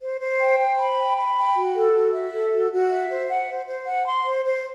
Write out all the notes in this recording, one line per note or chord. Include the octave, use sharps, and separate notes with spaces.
C5
C5
G5
C5
B5
G5
B5
G5
F#4
A4
F#4
E5
A4
F#4
F#4
E5
C5
F#5
C5
C5
F#5
C6
C5
C5